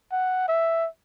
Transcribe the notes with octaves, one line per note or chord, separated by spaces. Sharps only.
F#5
E5